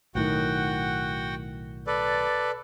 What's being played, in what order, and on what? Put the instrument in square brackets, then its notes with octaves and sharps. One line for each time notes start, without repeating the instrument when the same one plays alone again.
[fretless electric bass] B1 A2 D#3 [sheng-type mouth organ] F#4 F#5 G5
[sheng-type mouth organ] A4 B4 D5